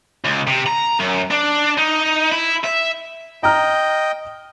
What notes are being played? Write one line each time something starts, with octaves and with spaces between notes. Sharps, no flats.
C#2
C3
A#5
F#2
D4
D#4
E4
E5
D#5 G5 A#5 F6